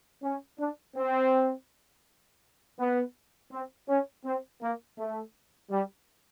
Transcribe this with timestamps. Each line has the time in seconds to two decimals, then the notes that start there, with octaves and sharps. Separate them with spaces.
0.23 C#4
0.59 D4
0.97 C4
2.79 B3
3.52 C4
3.88 C#4
4.25 C4
4.62 A#3
4.98 A3
5.71 G3